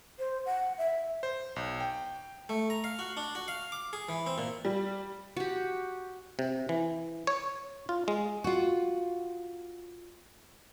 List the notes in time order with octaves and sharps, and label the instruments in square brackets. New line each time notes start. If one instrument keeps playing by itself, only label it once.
[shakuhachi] C5
F#5
E5
[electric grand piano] C5
B1
G5
[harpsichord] A3
A#5
F5
F#4
D4
F#4
F5
D6
G#4
E3
C4
A#2
[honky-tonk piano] G3
[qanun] F#4 G4
[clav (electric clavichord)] C3
E3
C#5
F4
G#3
[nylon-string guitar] F4 F#4